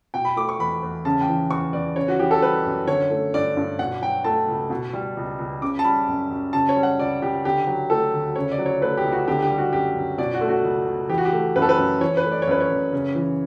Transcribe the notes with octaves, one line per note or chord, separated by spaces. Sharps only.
B2 G5
B5
A3 D6
C#6
E2 B5
E2
C#3 A5
G5
E3
E2 C#6
E2 D5
C#3 C#5
F#4
E3 G4
A4
G3 B4
F#2
D3 C#5
A3
G2 D5
G2
B2 F#5
F#3 G5
A3 A5
C#2
B2
G3
C#2
C#2
C#3 D6
A5
G3 B5
F#2
F#2
C#3 A5
C#5
G3
F#5
C#2 D5
C#2 G4
D3 G4
F#3
A3 A4
D2
C#3 C#5
D5
F#3
C#5
A3 B4
G4
C#2
F#4
D3 G4
G4
G3
F#4
F#2 G4
F#2
B2 D5
F#4
A3
F#4
C#2
C#2
E3 G4
F#4
G4
A3
F#2 B4
A4
B4
F#2
E3 C#5
B4
A3
D5
C#5
F#2 B4
C#5
F#2
C#3
E3